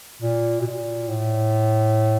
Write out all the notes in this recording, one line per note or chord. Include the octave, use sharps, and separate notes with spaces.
A#2
B2
A#2
A2